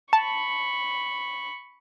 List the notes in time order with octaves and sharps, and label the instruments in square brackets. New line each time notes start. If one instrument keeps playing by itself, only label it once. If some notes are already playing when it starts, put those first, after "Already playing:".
[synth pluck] A5 [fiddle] B5 C#6